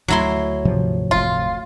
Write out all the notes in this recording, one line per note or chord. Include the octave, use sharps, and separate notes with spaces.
D2 F#3 E4 C6
G#2 C3 F3
F1 D2 F4